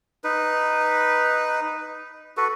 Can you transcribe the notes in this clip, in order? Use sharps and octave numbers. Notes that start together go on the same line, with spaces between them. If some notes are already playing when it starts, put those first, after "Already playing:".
D#4 B4
F#4 A4 B4